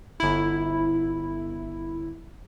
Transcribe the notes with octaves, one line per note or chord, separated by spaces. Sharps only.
G1 E4